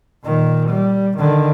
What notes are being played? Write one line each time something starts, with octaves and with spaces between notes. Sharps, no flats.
A#2 D#3
G3
D3 D#3